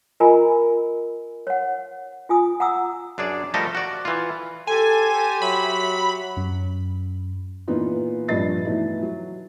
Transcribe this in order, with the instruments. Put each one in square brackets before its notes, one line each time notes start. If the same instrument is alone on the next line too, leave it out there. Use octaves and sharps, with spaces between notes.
[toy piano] F4 A#4 D#5 G#5 A#5 B5
C#5 F#5
F4 G#5 D#6
F#5 A#5 D#6 E6
[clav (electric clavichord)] F#2 D4 G#4 D5
F3 G3 A3 A4 A#4 D#5
F#4 D5
E3 F4
[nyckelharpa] G4 C5 [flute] A4 [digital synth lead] G#5
[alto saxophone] F#3 [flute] E5 [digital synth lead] B5
[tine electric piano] F#2
[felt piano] A#2 E3 B3 D#4 F4
A#1 G2 F3 D#5 A6 C7
B2 E3 A3 D#4 E4
F#3